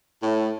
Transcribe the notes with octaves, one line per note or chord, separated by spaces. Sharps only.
A2